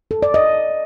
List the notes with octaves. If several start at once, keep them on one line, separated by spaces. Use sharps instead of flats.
A4
D5
D#5